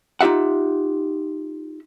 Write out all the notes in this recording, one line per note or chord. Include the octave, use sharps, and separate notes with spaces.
D#4 F4 G4 E5 F#5